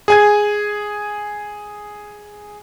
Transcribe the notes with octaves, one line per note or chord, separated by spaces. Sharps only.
G#4 G#5 G#6